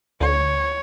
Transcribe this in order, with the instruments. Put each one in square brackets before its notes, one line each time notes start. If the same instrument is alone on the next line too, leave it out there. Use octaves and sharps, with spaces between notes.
[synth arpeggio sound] D2 [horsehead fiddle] C#5